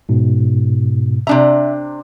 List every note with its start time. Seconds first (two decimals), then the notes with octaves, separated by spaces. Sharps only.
0.09 G#2 B2
1.27 C3 D4 E5 A#5